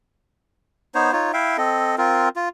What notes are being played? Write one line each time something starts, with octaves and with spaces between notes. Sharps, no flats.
B3 D#4 C5 C#5
D#4 F4 C#5
E4 E5 F5 G5
C4 A4 D#5
C4 F4 A#4
F4